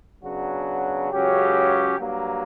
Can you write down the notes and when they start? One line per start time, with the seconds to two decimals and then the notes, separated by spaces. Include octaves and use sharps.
0.23 C#3 F#3 B3 D4 F#4
1.11 C#2 C#3 F#3 C#4 G4
1.98 G2 F#3 A#3